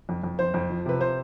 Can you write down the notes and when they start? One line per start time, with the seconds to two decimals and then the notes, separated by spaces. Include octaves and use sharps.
0.09 F2
0.23 F2
0.39 F2 C5
0.54 F2
0.70 F3
0.86 C3 B4
1.01 C5